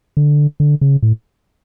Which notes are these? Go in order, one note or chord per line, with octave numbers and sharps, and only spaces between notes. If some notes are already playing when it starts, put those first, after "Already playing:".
D3
D3
C#3
A2